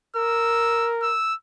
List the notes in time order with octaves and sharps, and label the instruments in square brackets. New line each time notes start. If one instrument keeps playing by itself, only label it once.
[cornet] A#4 [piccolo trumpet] E6
[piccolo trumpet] E6